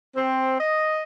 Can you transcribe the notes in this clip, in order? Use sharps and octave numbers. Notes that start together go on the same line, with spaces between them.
C4
D#5